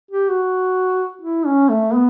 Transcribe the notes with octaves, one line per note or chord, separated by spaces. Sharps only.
G4
F#4
E4
C#4
A3
B3